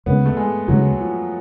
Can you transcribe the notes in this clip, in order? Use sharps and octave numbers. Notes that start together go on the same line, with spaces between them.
D2 C#3 G#3 B3
A3
G#3
D2 C#3 F#3 G#3
F3